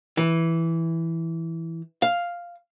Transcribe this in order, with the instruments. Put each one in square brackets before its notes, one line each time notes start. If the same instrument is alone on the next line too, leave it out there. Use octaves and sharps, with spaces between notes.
[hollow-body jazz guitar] E3
F5